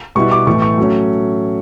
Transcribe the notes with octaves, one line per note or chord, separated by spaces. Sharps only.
B2 G3 B3 E4 C#6
D6
A2 E3 A3 E4 C#6
C#6
F#3 A3 C#4